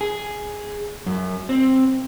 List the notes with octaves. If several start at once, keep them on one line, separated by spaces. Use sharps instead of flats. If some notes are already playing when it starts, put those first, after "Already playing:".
G#4
F#2
C4